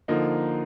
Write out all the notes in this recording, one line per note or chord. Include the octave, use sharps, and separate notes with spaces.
D3 F3 A#3 D#4